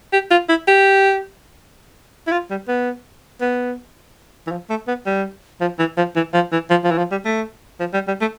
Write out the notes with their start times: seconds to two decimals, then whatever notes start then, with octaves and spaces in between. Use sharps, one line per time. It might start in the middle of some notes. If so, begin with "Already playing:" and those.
0.13 G4
0.31 F4
0.49 E4
0.68 G4
2.27 E4
2.32 F4
2.51 G3
2.68 B3
3.41 B3
4.47 E3
4.51 F3
4.70 A3
4.88 B3
5.06 G3
5.61 F3
5.79 E3
5.97 F3
6.16 E3
6.34 F3
6.52 E3
6.70 F3
6.84 F3
6.91 E3
6.98 F3
7.11 G3
7.25 A3
7.80 F3
7.94 G3
8.08 G3
8.21 A3